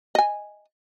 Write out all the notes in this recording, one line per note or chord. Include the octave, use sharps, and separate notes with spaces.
D#5 G#5